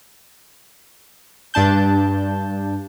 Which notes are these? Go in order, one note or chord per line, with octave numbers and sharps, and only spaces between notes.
G2 D4 A5 G6